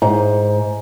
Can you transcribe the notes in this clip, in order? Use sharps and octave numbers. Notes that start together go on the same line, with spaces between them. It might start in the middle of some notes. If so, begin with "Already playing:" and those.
G#2